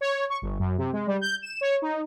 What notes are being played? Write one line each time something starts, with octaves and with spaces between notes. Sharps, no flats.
C#5
C#6
G1
F#2
C3
G#3
G3
G6
E7
C#5
D#4